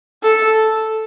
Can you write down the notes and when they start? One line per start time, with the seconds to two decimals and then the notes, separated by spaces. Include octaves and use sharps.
0.23 A4